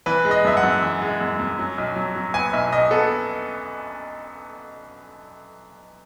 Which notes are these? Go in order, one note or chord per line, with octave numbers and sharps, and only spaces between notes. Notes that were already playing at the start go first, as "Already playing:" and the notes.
E3 B4
G#3
D#5
F#2 E5
F#5
F#2
E3
G#3
F#2
F#2
F#3
B1
F#3
F#3
B3 G#5
B1 E5
B1 D#5
B3 A4